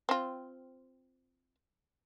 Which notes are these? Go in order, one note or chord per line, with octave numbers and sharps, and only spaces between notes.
C4 F4